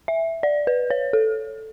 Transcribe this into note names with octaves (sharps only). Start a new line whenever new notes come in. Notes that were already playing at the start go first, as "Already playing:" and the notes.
E5
D5
B4
C#5
A4